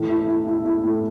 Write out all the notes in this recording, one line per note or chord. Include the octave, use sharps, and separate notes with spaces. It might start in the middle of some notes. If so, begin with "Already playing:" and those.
Already playing: A2 E3
E4
E4
E4
E4
A2